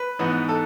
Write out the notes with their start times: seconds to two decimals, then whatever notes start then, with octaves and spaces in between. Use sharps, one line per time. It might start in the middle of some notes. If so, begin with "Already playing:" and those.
Already playing: B4
0.19 G#2 E3 B3 D#4
0.48 A4